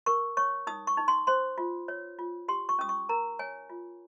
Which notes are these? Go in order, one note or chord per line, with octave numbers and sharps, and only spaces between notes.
A#4 C#6
C#5 C#6
D#4 D#6
C#6
D#4
C6
C5 C6
F4
C#5
F4
G4 C6
C#6
C#4 D#6
C#6
A#4 A#5
C#5 G#5
F4